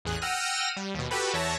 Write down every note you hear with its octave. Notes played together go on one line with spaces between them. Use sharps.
A1 E2 G#4 F#6
F#5 G5 E6 F6 A#6 D#7
G3
D#2 B2
F#4 G4 A4 B4 B5
E2 C#5 E5 A5 A#6